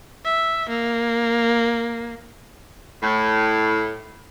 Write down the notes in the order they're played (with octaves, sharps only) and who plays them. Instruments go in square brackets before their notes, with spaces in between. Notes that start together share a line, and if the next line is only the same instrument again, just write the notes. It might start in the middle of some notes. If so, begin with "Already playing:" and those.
[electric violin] E5
A#3
[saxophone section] A2